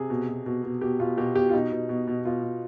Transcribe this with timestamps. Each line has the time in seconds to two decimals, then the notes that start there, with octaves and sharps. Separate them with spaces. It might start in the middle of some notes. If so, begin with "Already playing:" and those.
Already playing: C3 G#4
0.10 B2
0.28 B2
0.46 B2
0.64 B2
0.81 B2 G4
1.00 B2 F4
1.17 B2 G4
1.35 B2 G4
1.49 F4
1.53 B2 D#4
1.72 B2
1.89 B2
2.08 B2
2.25 B2 F4
2.43 B2